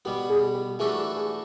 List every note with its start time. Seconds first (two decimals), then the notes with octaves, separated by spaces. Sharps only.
0.05 B2 G3 B3 G4
0.30 G#4
0.55 G4
0.79 E3 A3 D4 F#4 G#4 A4
0.98 G4
1.17 G#4